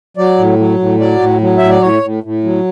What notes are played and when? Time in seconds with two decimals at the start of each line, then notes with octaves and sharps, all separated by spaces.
0.17 F#3 D5
0.38 A2
0.58 F#3
0.79 A2
0.99 F#3 D5
1.20 A2
1.41 F#3
1.58 A2 E5
1.70 D5
1.81 A2 C#5
2.03 A2
2.23 A2
2.44 F#3